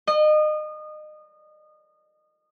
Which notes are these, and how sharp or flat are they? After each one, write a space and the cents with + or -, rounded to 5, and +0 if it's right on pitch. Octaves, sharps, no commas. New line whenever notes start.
D#5 -30